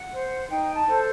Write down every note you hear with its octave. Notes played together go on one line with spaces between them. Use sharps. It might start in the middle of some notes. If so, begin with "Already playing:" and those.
Already playing: F#5
C5
D#4 G5
A5
A4 C5